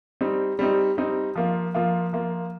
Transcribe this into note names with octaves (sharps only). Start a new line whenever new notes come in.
G3 C4 D#4
G3 C4 D#4
G3 C4 D#4
F3 A#3 F4
F3 A#3 F4
F3 A#3 F4